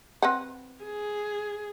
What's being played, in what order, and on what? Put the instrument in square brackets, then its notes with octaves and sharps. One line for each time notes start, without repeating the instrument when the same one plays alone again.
[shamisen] C4 B4 F#5
[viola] G#4